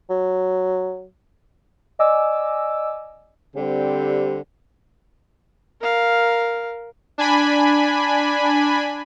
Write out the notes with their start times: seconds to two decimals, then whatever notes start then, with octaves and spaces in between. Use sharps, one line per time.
0.10 F#3
1.99 D5 D#5 G#5 D6 E6
3.56 D3 G3 C4 G4
5.81 A#4 F5
7.18 D4 G#5 B5